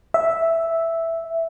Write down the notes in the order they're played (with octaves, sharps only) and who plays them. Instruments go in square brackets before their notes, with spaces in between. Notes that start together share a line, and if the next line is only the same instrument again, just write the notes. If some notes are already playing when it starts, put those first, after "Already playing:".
[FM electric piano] E5